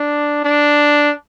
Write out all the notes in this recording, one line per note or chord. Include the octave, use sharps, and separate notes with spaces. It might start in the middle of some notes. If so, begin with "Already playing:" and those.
Already playing: D4
D4